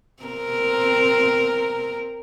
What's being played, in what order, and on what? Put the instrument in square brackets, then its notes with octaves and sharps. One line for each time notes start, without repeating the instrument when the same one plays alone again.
[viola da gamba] C4 A#4